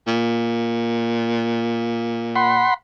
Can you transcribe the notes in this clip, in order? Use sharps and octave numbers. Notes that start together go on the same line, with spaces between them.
A#2
F#5 B5 C6